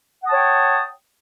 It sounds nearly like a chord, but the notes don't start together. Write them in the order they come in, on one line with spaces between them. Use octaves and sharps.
F#5 D#6 A5 C#5 G5